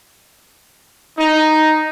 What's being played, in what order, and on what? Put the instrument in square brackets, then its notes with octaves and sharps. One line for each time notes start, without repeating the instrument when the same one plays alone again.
[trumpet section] D#4